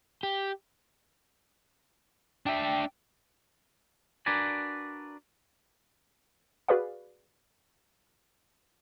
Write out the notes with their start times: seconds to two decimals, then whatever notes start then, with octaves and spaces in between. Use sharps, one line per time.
0.23 G4
2.46 D4 E5 G5
4.26 D4 F#4 A#4 B4 D5 G#5
6.68 F#4 G#4 B4 D5 F5